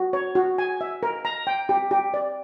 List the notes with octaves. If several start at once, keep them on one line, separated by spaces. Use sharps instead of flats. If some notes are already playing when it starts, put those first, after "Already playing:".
Already playing: F#4
C#5
F#4
G#5
E5
A#4
A#5
G5
G4
G4
D5